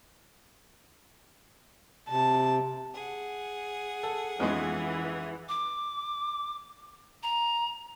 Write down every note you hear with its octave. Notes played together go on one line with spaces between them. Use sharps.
C3 A5
G#4 F#5
A4
F2 E3 G#3 B3 C#4 D#4
D6
A#5